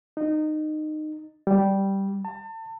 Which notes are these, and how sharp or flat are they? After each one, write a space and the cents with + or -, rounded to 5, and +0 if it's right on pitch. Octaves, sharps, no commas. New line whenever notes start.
D#4 -20
G3 -5
A5 +35